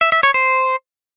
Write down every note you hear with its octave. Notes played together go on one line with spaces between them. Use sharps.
E5
E5
C#5
C5